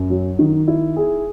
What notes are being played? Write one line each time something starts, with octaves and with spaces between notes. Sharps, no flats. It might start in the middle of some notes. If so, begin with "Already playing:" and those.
Already playing: F#2
F#3
D#3
E4
G#4